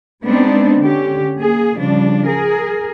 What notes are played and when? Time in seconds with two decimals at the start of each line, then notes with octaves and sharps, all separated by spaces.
0.23 G#3 B3 C4 D4 D#4
0.79 D3 C#4 G4
1.37 A#3 G#4
1.76 C#3 F3 G3 D4
2.27 G#4 A#4